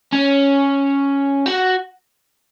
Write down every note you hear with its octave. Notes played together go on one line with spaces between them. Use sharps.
C#4
F#4